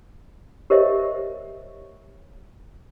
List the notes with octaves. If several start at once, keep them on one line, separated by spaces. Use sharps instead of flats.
G4 A#4 C5 C#5 D#5 E5